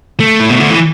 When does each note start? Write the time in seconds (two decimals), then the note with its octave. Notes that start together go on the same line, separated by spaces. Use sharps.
0.20 A3
0.40 A2
0.50 B2
0.60 D3
0.70 E3